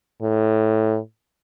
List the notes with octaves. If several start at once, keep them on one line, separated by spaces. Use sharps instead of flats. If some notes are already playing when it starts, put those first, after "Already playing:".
A2